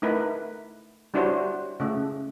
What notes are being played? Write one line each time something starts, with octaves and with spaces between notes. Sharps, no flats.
A3 D#4 E4 A#4 B4
G3 D4 E4 F#4 C5 C#5
C#3 A3